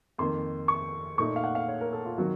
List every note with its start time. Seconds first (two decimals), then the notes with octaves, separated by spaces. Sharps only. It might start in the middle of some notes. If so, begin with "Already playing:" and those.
0.18 F2 D#3 A#3 C6
0.68 C#6
1.18 A#2 A3 D#4 C#6
1.36 F5
1.44 F#5
1.55 F5
1.68 C#5
1.81 A#4
1.93 A4
2.06 F4
2.18 D#3 F#3 C4 F#4